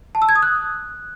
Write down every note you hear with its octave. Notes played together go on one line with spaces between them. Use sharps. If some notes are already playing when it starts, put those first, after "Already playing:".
A5
E6
G#6
D#6
F#6